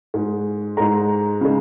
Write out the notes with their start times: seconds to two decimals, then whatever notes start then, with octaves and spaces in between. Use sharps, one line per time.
0.14 G#2 G#3
0.77 G#2 G#3 A#5
1.41 C#3 G#3